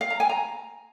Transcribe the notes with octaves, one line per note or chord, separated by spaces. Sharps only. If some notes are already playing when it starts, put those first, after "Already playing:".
F5
A#5
G#5
A#5